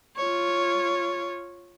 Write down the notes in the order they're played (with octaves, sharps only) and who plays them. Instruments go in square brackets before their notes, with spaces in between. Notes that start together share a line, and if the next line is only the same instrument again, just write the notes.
[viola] F4 C#5